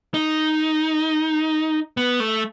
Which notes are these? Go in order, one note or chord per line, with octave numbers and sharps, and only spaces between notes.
D#4
B3
A3